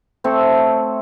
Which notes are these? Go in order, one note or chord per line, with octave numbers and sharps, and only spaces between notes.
A3 C4 A4 C#5